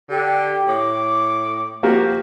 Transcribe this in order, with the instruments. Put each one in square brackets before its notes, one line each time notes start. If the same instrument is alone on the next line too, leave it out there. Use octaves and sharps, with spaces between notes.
[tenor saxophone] D3 [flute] G4
[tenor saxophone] A2 [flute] D6
[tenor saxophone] F3 [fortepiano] A#3 F#4 G4